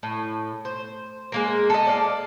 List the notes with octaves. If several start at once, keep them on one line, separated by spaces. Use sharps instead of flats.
A2
C5
G#3 A#3 A#4
A4 D#5
D5 F5